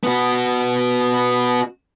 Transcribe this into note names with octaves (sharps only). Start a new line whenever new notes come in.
B3 F#4